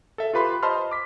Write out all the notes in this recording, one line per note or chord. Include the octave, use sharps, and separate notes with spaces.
A4 E5
F4 G4 B4 B5 C6
C5 D#5 A5 B5 C6 F6
D6 B6